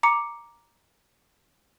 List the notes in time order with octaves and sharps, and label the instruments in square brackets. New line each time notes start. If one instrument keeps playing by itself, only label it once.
[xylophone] A#5 D6 C#7